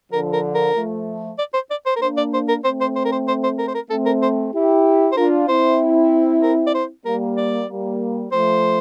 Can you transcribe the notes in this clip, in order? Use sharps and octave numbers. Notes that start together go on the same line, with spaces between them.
D3 F3 A#4
A#4
A#4
F3 A3
D5
C5
D5
C5
A#4
A#3 D4 C5
D5
C5
A#4
A3 C4 C5
C5
C5
A#4
C5
C5
C5
A#4
C5
A#4
A3 C4 A4
A#4
C5
E4 G4
C5
D4 F4 A#4
C4 E4 C5
A#4
D5
C5
G3 A#3 A#4
D5
G3 A#3
F3 A3 C5